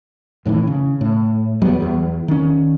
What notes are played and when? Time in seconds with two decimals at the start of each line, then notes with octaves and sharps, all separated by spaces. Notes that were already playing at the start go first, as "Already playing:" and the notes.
0.45 F2 A2 D#3 E3
0.67 C#3
1.01 A2
1.62 E2 F#3 G3 B3
1.82 E2
2.28 D#3 C#4